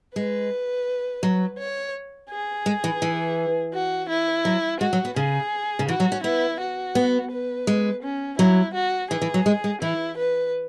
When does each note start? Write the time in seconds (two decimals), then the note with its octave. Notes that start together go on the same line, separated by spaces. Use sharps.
0.16 G#3 B4
1.23 F#3
1.58 C#5
2.30 G#4
2.66 G#3
2.84 E3
3.02 E3
3.73 F#4
4.09 E4
4.45 F#3
4.80 G#3 F#4
4.93 F#3
5.05 B3
5.16 C#3 G#4
5.79 C#3
5.88 E3 F#4
6.00 F#3
6.12 C#4
6.24 B3 E4
6.60 F#4
6.95 B3
7.31 B4
7.67 G#3
8.03 C#4
8.38 F#3 E4
8.74 F#4
9.10 E3 G#4
9.22 E3
9.34 F#3
9.46 G#3
9.64 G#3
9.82 E3 E4
10.18 B4